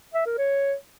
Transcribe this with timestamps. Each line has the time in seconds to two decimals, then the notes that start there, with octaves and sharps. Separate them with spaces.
0.14 E5
0.26 A#4
0.38 C#5